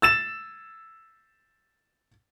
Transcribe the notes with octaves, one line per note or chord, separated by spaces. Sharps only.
E6 A6 E7